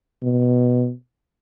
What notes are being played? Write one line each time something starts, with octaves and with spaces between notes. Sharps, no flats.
B2